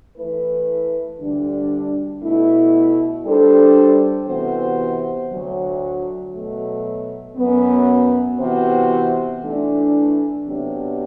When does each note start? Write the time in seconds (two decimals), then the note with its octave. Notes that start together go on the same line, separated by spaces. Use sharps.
0.16 E3 A3 E4 B4
1.19 D2 D3 G3 D4
2.22 B2 A3 E4
3.25 G3 D4 A4 C5
4.27 C3 E3 B3 F#4 C5
5.31 D2 D3 F#3
6.33 B2 F#3 A3
7.36 F#2 F#3 B3
8.40 C3 E3 B3 F#4 C5
9.42 E3 A3 D4
10.46 C3 F#3 B3 D4 G4